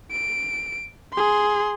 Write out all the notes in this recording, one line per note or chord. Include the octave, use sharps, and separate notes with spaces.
D7
G#4 C6